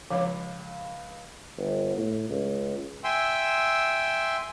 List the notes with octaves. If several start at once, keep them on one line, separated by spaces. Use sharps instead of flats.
C#2 F3 C#5 F5
G1
A2
C#2
E5 G5 G#5 C6 E6